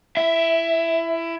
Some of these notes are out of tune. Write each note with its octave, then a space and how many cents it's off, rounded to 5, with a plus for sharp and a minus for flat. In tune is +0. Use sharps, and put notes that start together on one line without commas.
E4 +20 E5 +0